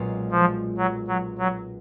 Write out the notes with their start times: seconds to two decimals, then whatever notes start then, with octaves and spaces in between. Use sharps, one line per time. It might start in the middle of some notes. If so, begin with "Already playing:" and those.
Already playing: B1 A#2 G#3 C#4 F4
0.31 F3
0.77 F#3
1.08 F#3
1.38 F#3